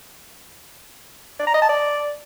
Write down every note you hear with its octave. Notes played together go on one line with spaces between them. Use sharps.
D5
A#5
D#5
A5
D5